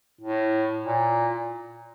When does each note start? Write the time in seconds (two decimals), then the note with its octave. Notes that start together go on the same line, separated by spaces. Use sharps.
0.21 A2
0.85 A#2